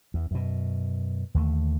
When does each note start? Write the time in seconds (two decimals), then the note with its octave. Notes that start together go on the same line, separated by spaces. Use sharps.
0.14 E2
0.31 F#2 B2
1.34 D#2 D3 A3